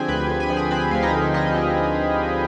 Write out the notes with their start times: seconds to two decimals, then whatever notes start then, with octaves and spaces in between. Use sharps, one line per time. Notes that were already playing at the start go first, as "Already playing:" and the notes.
Already playing: D3 F3 C4 G4 G#4 G5 G#5
0.08 D2 B4 B5
0.29 D3
0.40 G#5
0.48 F3 B5
0.57 G#4 G#5
0.70 C4 B4 B5
0.91 D2 F5
1.02 D#4 D#5
1.13 D3
1.34 F3 D#4 D#5
1.55 C4